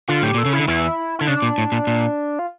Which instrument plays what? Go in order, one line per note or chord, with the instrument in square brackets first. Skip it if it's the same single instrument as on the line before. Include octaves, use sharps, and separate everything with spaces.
[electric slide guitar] D3 [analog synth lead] F4
[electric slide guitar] A2 [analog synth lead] G4
[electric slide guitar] A#2 [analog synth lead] A4
[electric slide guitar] C#3
[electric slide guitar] D3 [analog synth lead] E4
[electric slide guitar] E2 E3 [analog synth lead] E4
[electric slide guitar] D3 [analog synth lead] E4
[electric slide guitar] C#3 [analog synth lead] D4
[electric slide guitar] A#2
A2
A#2
A#2
[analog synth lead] F4